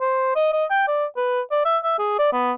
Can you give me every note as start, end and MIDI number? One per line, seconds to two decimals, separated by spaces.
0.01 0.31 72
0.36 0.51 75
0.53 0.65 75
0.70 0.83 79
0.88 1.05 74
1.16 1.41 71
1.51 1.63 74
1.65 1.77 76
1.83 1.95 76
1.99 2.15 68
2.18 2.29 74
2.33 2.52 59